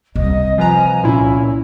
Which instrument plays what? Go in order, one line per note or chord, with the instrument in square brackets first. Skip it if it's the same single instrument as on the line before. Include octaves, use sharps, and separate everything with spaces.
[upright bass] C2 [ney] D#5
[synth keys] F3 B4 A#5 [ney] G#5
[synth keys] A#2 E4 [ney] C#4